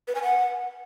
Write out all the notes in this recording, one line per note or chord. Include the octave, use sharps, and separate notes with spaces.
B4
G#5
F#5